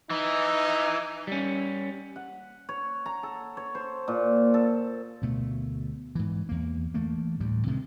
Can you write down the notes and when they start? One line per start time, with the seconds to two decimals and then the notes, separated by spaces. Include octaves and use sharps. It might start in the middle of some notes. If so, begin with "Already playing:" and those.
0.10 E3 D#4
1.27 G3 C#4
2.16 F#5
2.69 C#5
3.06 A#5
3.23 A4
3.57 C#5
3.75 C5
4.08 A#2
4.54 A4
5.22 D2 B2 A3
6.15 G#2 E3
6.49 E2 A#3
6.94 E3 A3 A#3
7.40 D2 A2 G3
7.67 C3 D#3 F3 G#3